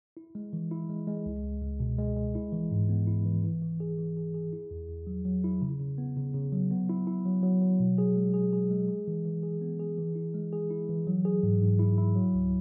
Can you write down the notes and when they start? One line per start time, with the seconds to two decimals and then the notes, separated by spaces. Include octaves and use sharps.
0.17 E4
0.35 G#3
0.53 E3
0.71 E4
0.89 G#3
1.07 G#3
1.26 C#2
1.43 C#2
1.62 C#2
1.80 B2
1.98 G#3
2.17 G#3
2.35 E4
2.52 E3
2.71 G#2
2.89 B3
3.07 E4
3.26 E3
3.44 E3
3.62 E3
3.80 G#4
3.98 E3
4.17 G#4
4.34 G#4
4.53 E4
4.71 E2
4.89 E2
5.07 F#3
5.25 F#3
5.44 E4
5.62 C#3
5.79 C#3
5.98 B3
6.16 C#3
6.34 C#3
6.52 F#3
6.71 B3
6.89 E4
7.07 E4
7.26 F#3
7.43 F#3
7.62 F#3
7.80 B2
7.98 G#4
8.16 G#3
8.34 G#4
8.53 G#4
8.70 G#3
8.88 G#4
9.08 E3
9.25 E3
9.43 G#4
9.61 B3
9.80 G#4
9.98 E3
10.15 E4
10.34 G#3
10.53 G#4
10.70 E4
10.89 E3
11.07 F#3
11.25 G#4
11.43 G#2
11.61 G#2
11.79 E4
11.98 E4
12.16 F#3
12.34 C#2